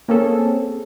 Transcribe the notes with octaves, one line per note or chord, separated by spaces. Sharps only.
A#3 C4 C#4 G#4 A4